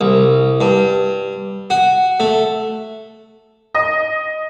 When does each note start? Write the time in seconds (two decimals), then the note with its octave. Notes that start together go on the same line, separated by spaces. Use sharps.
0.01 C2
0.61 G2
1.70 F#4
2.20 A3
3.75 D#5